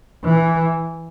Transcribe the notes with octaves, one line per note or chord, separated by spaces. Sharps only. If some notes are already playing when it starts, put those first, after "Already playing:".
E3